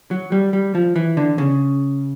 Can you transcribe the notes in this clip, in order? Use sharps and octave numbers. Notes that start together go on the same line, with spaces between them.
F#3
G3
G3
F3
E3
D3
C#3